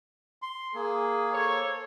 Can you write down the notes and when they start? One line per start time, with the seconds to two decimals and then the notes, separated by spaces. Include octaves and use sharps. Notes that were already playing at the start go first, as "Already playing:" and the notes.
0.42 C6
0.74 A#3 G#4
1.33 A4 C5 C#5